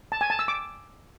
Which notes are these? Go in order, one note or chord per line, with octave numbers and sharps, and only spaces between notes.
A5
G#5
A5
E6
D6